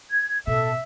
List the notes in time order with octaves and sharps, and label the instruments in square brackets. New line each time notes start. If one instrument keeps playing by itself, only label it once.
[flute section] G#6
[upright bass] A1 B2 [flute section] A4 [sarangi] E5